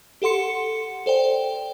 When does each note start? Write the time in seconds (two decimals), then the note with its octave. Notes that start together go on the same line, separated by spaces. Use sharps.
0.22 G4 A4 F#5 C6 C#7
1.06 A4 C5 D5 G5